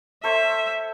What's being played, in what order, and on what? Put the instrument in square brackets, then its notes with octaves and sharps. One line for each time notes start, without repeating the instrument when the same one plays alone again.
[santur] A4 C5 C#5 [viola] E5